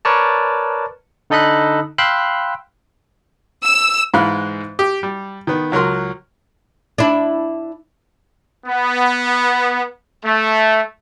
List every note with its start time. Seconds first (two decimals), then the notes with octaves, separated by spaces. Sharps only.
0.05 A#4 B4 C#5 D5 A5
1.30 D3 D#4 A4 D#5 B5 F#6
1.98 F5 G5 B5 C6 E6 F#6
3.66 E6
4.14 G#2 E3 G#3 F5 B5 F#6
4.79 G4
5.03 G3
5.47 D#3 B3
5.72 C#2 F#3 A#4 C6
6.98 D4 E4
8.66 B3
10.24 A3